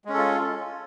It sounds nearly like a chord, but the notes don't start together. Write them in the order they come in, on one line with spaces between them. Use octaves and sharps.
G#3 C#4 A4 F4